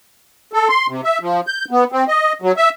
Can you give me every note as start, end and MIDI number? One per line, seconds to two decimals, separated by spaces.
0.53 0.68 69
0.69 0.87 84
0.89 1.01 48
1.04 1.18 76
1.21 1.41 53
1.47 1.65 91
1.71 1.84 59
1.92 2.04 60
2.08 2.33 75
2.42 2.52 54
2.57 2.69 76